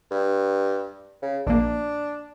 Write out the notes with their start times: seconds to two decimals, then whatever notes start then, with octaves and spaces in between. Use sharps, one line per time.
0.11 G2
1.22 C#3
1.47 A#1 A#3 D4